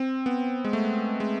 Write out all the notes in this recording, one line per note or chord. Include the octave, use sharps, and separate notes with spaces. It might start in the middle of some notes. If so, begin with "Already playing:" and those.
Already playing: C4
B3
G#3
A3
G#3